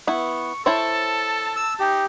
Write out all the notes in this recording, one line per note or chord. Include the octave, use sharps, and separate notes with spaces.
B3 E4 C#6
E4 A4 C5 C#5 A5
E6
D#4 G4